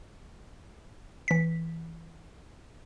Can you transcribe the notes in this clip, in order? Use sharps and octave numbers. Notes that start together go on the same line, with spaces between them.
E3 B6